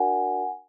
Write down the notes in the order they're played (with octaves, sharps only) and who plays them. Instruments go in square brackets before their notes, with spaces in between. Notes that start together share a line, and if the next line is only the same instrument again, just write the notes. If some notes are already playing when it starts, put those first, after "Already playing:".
Already playing: [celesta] D4 F#4 A#4 D5 F#5 G#5